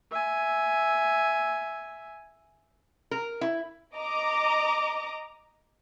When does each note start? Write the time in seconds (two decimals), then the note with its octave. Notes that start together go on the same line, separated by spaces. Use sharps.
0.11 E5 G#5
3.11 A#4
3.41 E4
3.95 D#5 A#5 D6